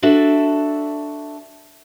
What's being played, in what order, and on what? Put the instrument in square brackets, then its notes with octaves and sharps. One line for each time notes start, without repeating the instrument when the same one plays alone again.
[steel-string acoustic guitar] D4 F#4 A4 D5 E5